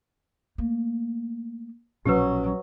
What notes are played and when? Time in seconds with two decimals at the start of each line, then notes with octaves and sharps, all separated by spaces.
0.58 A3 A#3
2.05 A#1 B2 F#3 C#4 G4 B4